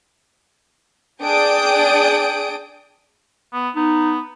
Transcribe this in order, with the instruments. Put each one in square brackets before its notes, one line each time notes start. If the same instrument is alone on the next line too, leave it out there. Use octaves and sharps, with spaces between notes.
[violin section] D4 G#4 D5 G5 D#6 D7
[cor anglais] B3
[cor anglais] B3 [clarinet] D#4